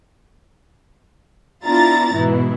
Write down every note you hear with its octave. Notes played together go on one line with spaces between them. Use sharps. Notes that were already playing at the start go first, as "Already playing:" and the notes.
B3 D4 E4 F4 A#5 A6
G#2 B2 E3 E4